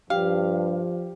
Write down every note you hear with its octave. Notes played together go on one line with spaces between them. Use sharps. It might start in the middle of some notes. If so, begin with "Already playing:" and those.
G2 F3 G4 F5